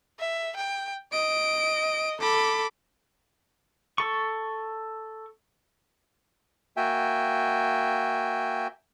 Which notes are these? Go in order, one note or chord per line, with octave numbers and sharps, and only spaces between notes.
E5
G5
D#5 D7
A4 B5 D6
A4 C#6
A#3 F#4 E5 G5 G#5